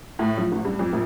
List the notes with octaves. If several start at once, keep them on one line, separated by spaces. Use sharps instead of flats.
A2
F3
A1
G2
F2
A#1